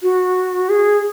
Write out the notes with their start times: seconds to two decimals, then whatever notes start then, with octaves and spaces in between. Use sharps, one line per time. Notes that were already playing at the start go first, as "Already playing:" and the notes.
0.03 F#4
0.69 G#4